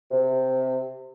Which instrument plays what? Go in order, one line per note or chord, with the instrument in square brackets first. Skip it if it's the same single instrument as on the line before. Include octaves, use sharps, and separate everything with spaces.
[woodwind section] C3